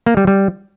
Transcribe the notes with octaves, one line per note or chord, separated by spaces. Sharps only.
A#3
G3
G3